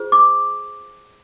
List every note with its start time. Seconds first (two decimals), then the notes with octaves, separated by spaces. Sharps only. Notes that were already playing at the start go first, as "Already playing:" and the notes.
Already playing: F4 G#4 C5
0.12 D6